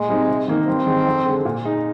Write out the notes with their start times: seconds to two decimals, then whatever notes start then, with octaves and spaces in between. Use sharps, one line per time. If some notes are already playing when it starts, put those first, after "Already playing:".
Already playing: A#2 G#3
0.09 G3 C4 D#4
0.28 C3
0.48 D#3 A#3 D#4
0.67 G2 C4
0.86 D#3 G#3 D#4
1.07 F2
1.26 D3 G#3
1.45 A#2
1.64 G#3 D#4